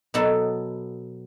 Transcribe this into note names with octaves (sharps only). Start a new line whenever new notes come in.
B2 F#3 B3 A4